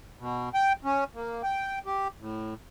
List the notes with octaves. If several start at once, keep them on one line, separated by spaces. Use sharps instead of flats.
B2
G5
C#4
A#3
G5
G4
A2